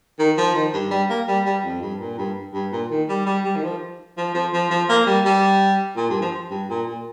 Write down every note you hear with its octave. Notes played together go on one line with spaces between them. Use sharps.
D#3
F3
D#3
G2
G3
A#3
G3
G3
F2
G2
A#2
G2
G2
A#2
D#3
G3
G3
G3
D#3
F3
F3
F3
F3
F3
A#3
G3
G3
A#2
G2
F3
G2
A#2
A#2